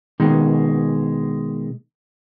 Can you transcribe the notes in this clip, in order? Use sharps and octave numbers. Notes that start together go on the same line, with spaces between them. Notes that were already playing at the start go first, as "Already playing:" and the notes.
B2 D#3 G#3